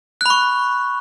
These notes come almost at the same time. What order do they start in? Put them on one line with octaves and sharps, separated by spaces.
F#6 B5 C#6